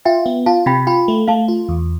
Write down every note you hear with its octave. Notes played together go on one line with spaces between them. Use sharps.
F4 E5 G5
B3
F4 F5 A5
C3 G5 B5
F4 G5 B5
A3
A3 F5 A5
F4
E2